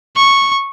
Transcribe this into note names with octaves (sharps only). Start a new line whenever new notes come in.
C#6